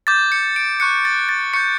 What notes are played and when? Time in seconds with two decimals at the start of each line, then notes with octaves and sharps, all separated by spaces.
0.07 D6 G6 A6
0.32 C#7
0.56 D7
0.80 C#6 F#6 C#7
1.05 A6
1.29 A6
1.54 C#6 G6 C#7